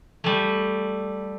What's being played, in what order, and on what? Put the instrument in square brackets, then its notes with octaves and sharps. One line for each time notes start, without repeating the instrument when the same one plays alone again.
[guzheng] G3 A3